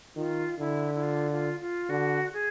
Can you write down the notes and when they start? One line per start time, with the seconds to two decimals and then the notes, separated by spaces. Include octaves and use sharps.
0.16 D#3 F4
0.59 D3 E4
0.95 E4
1.03 F4
1.32 F4
1.60 F4
1.89 D3 F#4
2.33 G#4